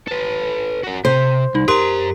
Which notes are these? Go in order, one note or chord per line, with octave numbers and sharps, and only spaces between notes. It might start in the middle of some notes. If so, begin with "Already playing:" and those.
A4 B4
F#4 A#4
C3 G4 C5
C2 D#4
F#2 G4 A#4 A#5 C6